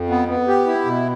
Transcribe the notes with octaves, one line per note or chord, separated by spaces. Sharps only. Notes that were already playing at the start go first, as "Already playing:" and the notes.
Already playing: F2
B3
B3
G4
E4
B2